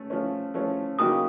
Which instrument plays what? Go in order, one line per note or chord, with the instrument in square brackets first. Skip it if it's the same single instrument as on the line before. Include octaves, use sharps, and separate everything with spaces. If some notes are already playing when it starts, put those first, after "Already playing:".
Already playing: [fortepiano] A3 C#4
F3 A3 C#4
F3 A3 C#4
[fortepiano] C#3 F#3 A#3 D#4 G4 [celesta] D#6